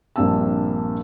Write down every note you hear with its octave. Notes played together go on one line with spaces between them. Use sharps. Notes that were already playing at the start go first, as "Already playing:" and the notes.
A#1 G2 A#3 C4 A5 E6